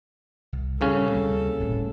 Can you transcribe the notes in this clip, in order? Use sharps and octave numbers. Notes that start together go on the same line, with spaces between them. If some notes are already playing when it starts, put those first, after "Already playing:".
C2
C2 G2 A#2 C#3 C#4 A4
D2 G3 A#3
D1 G1 A2